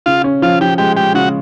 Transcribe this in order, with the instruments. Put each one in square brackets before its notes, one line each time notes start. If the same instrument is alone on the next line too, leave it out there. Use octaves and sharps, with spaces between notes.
[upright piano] C#3 [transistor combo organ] F4
[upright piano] C#4
[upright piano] F3 [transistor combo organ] F4
[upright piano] F3 [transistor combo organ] G4
[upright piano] G#3 [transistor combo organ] G4
[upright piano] G#3 [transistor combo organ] G4
[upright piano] C#3 [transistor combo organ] F#4